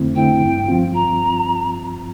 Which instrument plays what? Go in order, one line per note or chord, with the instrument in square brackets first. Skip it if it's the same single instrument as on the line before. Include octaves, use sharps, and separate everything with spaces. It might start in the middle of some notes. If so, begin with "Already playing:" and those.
Already playing: [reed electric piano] F2 D3 A3 C4 E4
[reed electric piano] D3 A3 C4 E4 [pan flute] G5
[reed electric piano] G2
F3 C4 F4
[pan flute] A#5